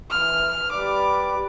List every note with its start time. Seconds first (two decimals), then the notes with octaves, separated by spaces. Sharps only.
0.10 E3 F6
0.72 G3 B4 D5 D6